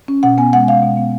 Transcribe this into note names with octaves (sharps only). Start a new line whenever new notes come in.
C#4
B2 F#5
B3 G#5
G#3 F#5
B2 F5
B2
B3